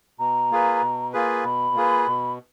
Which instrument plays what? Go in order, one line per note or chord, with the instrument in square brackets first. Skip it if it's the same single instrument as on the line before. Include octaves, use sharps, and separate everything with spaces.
[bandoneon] B2 [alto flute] A#5
[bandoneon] A#3 F4 G#4 B4
B2
A#3 F4 G#4 B4
[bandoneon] B2 [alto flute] B5
[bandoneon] A#3 F4 G#4 B4
B2